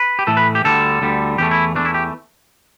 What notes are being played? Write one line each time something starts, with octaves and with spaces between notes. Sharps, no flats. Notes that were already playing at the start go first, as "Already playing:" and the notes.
Already playing: B4
G4
A2 E3 A3 A4
B4
G4
D2 D3 G3 A4
D2 D3 G3
E2 E3 A3 G4
E4
E2 E3 A3 D4
E4
G4